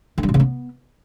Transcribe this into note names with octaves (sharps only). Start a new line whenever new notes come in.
D3
G3
B2
C#3
B3